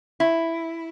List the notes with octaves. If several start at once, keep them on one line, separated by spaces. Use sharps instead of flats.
E4